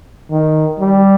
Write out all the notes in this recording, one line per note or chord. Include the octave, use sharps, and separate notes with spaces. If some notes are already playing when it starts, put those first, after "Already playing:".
D#3
G3